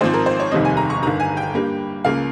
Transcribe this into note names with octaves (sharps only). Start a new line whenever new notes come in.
G#1 G#2 F3 C4 C5
A#4
C5
C#5
F1 D#2 D#3 G3 C4 D#5
G#5
A#5
C#6
G1 G2 D#3 A#5
G#5
G5
G2 G3 A#3
C#2 C#3 F3 A#3 F5